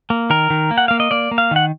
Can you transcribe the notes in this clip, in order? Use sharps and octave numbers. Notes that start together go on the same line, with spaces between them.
A#3
D#3 A#4
D#3
A#3
F#5
A#3 F5
D#5
A#3 D5
A#3
F5
D#3 F#5